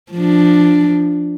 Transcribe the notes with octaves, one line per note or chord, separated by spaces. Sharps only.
F3 D4